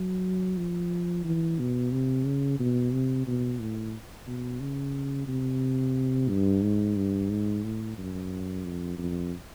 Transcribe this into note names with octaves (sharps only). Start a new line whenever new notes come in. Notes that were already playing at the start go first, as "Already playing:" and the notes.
Already playing: F#3
F3
E3
B2
C3
C#3
B2
C3
B2
A2
B2
C#3
C3
G2
G#2
G2
G#2
A2
F#2
F2
F2